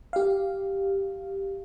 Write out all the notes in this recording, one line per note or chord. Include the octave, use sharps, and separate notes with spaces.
G4 F5